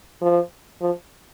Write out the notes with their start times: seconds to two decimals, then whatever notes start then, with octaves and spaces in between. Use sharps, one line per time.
0.21 F3
0.82 F3